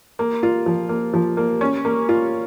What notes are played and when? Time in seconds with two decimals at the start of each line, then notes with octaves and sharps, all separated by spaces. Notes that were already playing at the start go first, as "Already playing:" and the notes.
0.19 A#3
0.43 F4
0.66 F3
0.89 A#3
1.14 F3
1.37 A#3
1.61 C#4
1.85 A#3
2.09 F4